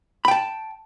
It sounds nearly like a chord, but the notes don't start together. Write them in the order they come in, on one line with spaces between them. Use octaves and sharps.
B5 G5 A5